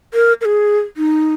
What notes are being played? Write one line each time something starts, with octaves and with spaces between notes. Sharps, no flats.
A#4
A#4
G#4
D#4